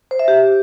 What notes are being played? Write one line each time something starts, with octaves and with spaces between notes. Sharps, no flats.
C5
E5
G4